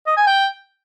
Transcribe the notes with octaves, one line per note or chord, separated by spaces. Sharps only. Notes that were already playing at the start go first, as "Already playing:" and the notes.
D#5
G#5
G5